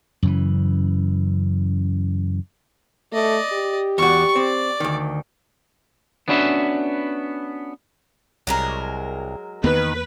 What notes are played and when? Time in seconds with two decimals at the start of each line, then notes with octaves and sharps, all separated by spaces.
0.23 F#2 C#3 E3
3.13 A3 D5 D#5
3.53 G4
3.98 E2 F#4 D5 C#6
4.35 C4 D5
4.80 D2 D#3
6.28 B3 C#4 D4 F#4 B4 E5
8.47 C2 F#3 G#3 A#4
9.64 E2 D#3 A#3 B3 B4